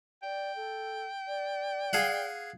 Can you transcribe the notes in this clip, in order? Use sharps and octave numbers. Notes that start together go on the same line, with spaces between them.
D5 G5
A4
D5
G#4 F5 F#5